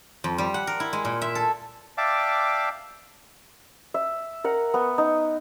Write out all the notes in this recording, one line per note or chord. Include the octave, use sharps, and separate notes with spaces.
F2
G3
F#5
A#4
E4
G#3
A#2
E5
A4
D5 E5 F5 G5 A5 D6
E5
A#4 F#5
B3
D#4